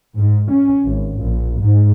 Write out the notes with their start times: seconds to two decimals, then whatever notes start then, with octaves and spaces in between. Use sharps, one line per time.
0.16 G#2
0.51 C#4
0.86 G#1
1.21 A#1
1.60 G#2